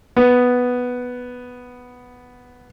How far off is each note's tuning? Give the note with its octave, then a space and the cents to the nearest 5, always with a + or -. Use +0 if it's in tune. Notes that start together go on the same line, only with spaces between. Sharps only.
B3 +0